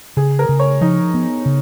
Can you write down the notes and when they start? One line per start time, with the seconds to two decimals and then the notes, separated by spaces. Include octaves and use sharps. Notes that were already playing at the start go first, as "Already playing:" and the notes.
0.17 C#3 G#4
0.39 A#4
0.49 C#3
0.59 C#5
0.81 F3 D#4
1.14 B3
1.46 C#3